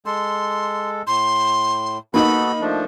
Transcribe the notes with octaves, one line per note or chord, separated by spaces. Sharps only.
G#3 A4 C6
A2 C6
A#3 B3 D#4 F#4 A4 D#5 B5
F3 A3 D4